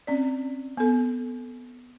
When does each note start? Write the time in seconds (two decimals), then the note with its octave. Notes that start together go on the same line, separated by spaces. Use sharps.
0.07 C4 C#4 D5
0.77 B3 A4